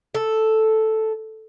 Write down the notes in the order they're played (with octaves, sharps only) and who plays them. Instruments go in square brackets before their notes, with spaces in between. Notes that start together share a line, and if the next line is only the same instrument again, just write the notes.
[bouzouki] A4